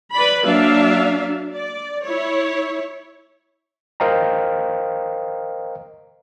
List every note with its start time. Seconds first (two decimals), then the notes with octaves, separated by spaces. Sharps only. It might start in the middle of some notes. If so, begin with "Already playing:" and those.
0.13 B4 D5 B5
0.44 F#3 A#3 D4 E5 F5
1.53 D5
2.04 E4 C#5
4.00 A#4 C5 D#5 F5 G5 A#5